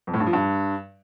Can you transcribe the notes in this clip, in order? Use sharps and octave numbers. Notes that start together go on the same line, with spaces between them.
F2
A2
G2
F3
G2